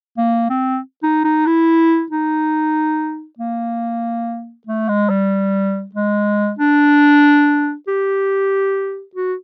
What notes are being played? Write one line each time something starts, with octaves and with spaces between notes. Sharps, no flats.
A#3
C4
D#4
D#4
E4
D#4
A#3
A3
G#3
G3
G#3
D4
G4
F#4